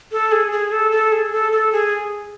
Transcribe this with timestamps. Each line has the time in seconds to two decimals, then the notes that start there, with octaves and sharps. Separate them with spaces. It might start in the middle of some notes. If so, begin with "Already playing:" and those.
0.12 A4
0.32 G#4
0.52 G#4
0.72 A4
0.92 A4
1.12 G#4
1.32 A4
1.52 A4
1.72 G#4